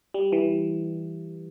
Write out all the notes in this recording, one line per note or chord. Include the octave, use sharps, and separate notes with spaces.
G3
E3